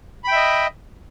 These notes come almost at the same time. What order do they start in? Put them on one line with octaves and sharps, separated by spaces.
B5 G5 E5 D#5